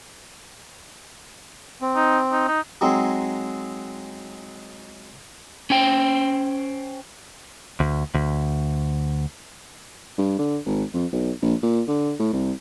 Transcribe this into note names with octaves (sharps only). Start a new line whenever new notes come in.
C4
D#4
D#4
D#4
F#3 G#3 C4 D#4
C#4 C5 G5
D2
D2
G2
D3
G#1
F2
B1
A#1
A#2
D3
A2
C2